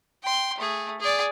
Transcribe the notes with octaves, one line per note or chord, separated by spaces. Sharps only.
G5 C6
A3 G#4
G#4 D5